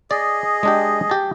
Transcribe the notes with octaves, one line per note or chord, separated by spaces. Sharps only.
G#4 D5 D#5
G#3 D4 G4
G4 A5